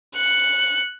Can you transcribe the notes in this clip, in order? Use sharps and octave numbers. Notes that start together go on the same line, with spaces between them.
F#6 C#7